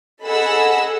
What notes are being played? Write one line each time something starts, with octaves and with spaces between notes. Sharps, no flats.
G#4 A4 D#5 F#5 B5 E6